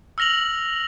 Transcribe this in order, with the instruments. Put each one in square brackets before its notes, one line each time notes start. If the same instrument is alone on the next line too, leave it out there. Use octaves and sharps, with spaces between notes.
[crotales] E6 F6 A#6 F7 F#7